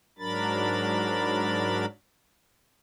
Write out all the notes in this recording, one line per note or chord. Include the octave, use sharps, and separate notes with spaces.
G#2 F#3 D4 A#4 B5 A6